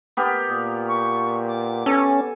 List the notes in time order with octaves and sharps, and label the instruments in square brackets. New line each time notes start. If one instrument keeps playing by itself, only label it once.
[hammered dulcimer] B3 G4 A#4
[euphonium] A#2
[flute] C#6
D6
[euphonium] B3 [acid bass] C#4 [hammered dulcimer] A4 G#5